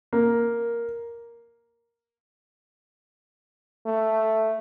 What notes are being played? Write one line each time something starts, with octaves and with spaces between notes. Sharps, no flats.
A#3
A3